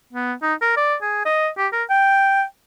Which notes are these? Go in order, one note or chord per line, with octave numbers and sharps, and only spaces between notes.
B3
D#4
A#4
D5
G#4
D#5
G4
A#4
G5